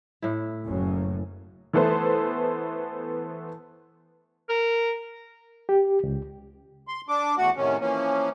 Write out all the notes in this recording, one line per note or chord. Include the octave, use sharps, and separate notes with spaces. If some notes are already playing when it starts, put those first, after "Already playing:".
A2 E4
F#1 F#2
E3 A3 B3 A4 B4 C5
A#4
G4
C#2
C6
D4 D6
E2 A3 F#4 F#5
A2 C3 D#3 C#4
E3 F3 A#3 C#4